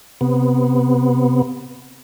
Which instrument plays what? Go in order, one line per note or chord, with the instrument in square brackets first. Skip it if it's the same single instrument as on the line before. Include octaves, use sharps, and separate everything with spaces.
[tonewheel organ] C3 B3